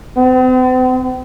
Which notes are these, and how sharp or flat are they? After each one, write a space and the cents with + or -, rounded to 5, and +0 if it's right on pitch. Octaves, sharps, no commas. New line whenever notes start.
C4 -45